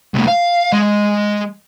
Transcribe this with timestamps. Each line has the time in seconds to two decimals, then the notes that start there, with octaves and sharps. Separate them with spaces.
0.14 C2 A2
0.28 F5
0.73 G#3